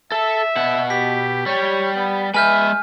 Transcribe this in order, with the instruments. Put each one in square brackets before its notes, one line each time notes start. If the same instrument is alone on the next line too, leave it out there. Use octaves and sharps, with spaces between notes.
[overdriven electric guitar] A4 A5 [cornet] E5
[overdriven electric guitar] B2 F#5
[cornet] G4 [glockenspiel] B6
[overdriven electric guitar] G3 G4 [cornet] C#5
[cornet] B3
[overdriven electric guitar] G#3 E5 [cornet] B4 [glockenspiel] G#5 F6 G6